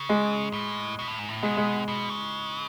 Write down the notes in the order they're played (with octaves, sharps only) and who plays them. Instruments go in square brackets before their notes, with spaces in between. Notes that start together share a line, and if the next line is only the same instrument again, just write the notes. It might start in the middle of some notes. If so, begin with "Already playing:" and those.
Already playing: [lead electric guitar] C#3
[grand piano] G#3
[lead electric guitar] A2
B2
A2
G#2
A2
[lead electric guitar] B2 [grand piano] G#3
[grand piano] G#3
[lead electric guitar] B2
C#3